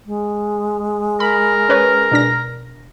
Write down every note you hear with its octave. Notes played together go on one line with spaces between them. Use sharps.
G#3
A#4 B5
C#4 B4 C#5
B2 D4 A#6